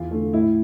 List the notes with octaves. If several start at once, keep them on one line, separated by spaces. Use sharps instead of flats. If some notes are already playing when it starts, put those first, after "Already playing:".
Already playing: E2 F4
D3 A3
A2 E4